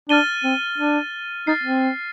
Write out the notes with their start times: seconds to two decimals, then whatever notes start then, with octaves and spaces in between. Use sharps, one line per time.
0.09 D4 F6 A6 D#7 G7
0.44 C4
0.78 D4
1.47 D#4 F6 A6 C7
1.63 C4